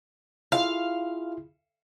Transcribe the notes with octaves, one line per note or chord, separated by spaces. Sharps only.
E4 F4 G#4 F5